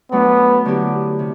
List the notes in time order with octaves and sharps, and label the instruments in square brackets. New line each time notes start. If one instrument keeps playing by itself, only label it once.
[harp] F#3 A3 D4 F#4 [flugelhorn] B3
[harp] D3 F#3 B3 E4 G4
C3